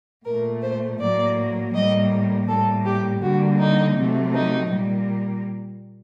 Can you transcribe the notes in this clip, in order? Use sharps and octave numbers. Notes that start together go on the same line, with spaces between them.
A#2 A3 A#4
C5
A2 F#3 A#3 D5
A2 G3 A#3 D#5
A2 G3 A#3 A4
G4
D3 G3 A#3 F#4
D#4
C3 F#3 A3
D#4
A#2 G3 A#3